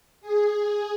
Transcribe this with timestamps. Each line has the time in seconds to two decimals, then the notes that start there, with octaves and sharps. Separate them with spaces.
0.21 G#4